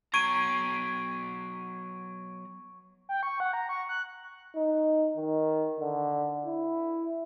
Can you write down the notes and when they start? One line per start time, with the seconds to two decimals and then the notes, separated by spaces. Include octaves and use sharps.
0.14 F#3 B3 A#5 C#6 G#6 D7 D#7
3.09 G5
3.23 C#6
3.40 F#5
3.53 A#5
3.69 C#6
3.89 F#6
4.56 D#4
5.17 D#3
5.80 D3
6.46 E4